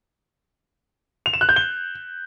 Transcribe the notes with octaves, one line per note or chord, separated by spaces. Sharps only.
F7
E7
F#6
G6
G7